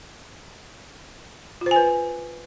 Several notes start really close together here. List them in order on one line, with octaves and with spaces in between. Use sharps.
F4 C5 G#5 B4